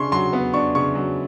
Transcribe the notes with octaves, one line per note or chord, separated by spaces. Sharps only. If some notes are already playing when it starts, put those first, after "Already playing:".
Already playing: C#3 D4 C6 C#6
F#3 C6
B3
D4 C#6
C#3 C#6
F#3